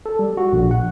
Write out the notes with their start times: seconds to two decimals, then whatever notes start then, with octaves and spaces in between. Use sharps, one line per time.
0.06 A4
0.19 G3
0.37 F#4
0.53 A#1
0.71 F#5